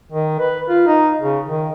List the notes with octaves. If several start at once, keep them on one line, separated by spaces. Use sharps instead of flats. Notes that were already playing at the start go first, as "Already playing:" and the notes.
D#3
B4
F4
D#4
C#3
D#3